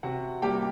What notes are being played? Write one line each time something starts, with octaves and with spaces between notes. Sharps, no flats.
C3 F#4 F#5
G3 A#3 G4 G5